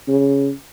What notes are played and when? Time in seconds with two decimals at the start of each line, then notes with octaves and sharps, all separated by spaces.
0.08 C#3